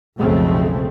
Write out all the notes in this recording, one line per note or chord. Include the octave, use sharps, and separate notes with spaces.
B1 F2 C#3 G#3 A3 C4